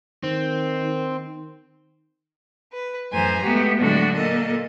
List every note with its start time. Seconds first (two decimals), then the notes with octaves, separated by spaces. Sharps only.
0.23 D#3 C4
2.73 B4
3.11 F#2 A2 E3 C5 G#5 A#5
3.42 G#3 A3 B3 F#4 G4
3.80 A2 D3 F#3 G#3 D4 F#4
4.15 A#2 A#3 A4 D#5